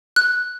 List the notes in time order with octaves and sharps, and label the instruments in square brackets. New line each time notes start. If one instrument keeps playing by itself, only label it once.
[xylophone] F#6